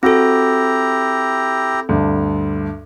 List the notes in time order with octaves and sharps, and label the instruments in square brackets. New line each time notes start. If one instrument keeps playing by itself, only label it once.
[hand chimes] C4 A4 [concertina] E4 G4 A#5 [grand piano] F#4
[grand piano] D2 G2